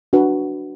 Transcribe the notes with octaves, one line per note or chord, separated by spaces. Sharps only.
D4 F#4 B4